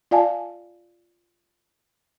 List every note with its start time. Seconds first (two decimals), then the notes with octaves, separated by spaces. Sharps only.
0.11 F4 D5 F5 G#5 A5